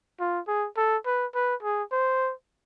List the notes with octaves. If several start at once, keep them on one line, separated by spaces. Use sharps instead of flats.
F4
G#4
A4
B4
B4
G#4
C5